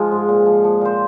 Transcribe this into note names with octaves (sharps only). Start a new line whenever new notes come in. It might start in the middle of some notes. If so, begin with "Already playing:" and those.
Already playing: F3 G#3 F4 G#4
G#2
A#2
F3
F3
A#2 C5